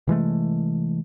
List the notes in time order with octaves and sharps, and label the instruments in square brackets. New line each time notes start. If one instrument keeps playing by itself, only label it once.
[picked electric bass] C3 E3 G#3 A3